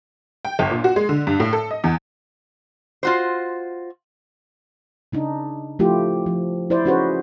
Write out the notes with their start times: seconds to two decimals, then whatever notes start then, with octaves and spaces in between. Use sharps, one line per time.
0.45 G5
0.59 G1
0.71 A#2
0.84 F#4
0.96 G#3
1.09 D3
1.27 G2
1.40 A2
1.53 A4
1.71 D#5
1.84 E2
3.03 F4 F#4 C5
5.12 C#3 D4 D#4
5.79 F3 A3 E4 F4 G4
6.26 F3
6.70 E4 C5 D5
6.85 C#4 D#4 F#4 G#4 B4 C5